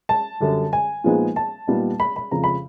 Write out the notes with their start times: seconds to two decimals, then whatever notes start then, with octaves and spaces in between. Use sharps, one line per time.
0.09 A5
0.40 F#2 D3 G3
0.73 G#5
1.04 A#2 F3 G#3 B3 D#4
1.36 A5
1.67 A#2 G3 B3 D#4
2.00 B5
2.16 B5
2.31 F2 C#3 F3 A#5
2.44 B5